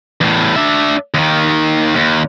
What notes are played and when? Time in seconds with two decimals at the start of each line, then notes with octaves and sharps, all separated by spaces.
0.21 E2 A2
0.56 D4 E5
1.14 D#2 D#3
1.95 D#2